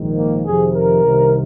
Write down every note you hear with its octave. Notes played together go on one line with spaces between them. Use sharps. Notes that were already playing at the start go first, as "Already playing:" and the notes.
Already playing: A#1 G#2 D#3
A#3
F2 C3 D#3 G#4
A#4
C2 C3 D#3